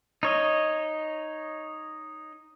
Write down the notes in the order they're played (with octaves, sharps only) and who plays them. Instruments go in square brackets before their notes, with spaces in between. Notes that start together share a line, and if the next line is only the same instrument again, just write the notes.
[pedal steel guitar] D#4 C#5 D#5